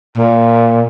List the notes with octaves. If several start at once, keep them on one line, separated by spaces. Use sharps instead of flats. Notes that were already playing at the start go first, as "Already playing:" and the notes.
A#2